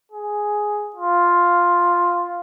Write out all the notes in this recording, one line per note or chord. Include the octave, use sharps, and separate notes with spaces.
G#4
F4